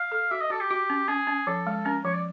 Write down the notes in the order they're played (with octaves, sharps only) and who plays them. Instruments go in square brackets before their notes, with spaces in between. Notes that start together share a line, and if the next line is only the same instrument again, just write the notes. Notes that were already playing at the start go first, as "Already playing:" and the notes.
Already playing: [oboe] F5
[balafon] A4
[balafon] F#4 [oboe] E5
[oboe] D#5
[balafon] F#4 [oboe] A4
[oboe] G4
[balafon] F#4
C#4
[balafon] C#4 [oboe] G#4
[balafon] C#4
[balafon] F3 [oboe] A4
[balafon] G#3
[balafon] C#4 [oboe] A#4
[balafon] F3 [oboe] C#5
[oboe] D5